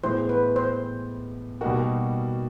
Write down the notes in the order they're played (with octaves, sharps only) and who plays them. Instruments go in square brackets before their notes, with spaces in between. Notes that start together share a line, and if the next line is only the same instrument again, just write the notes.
[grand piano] A2 E3 G#3 B3 [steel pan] C5
[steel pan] B4
C5
[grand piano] B2 G3 A#3 D#4 F#4 [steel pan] A#4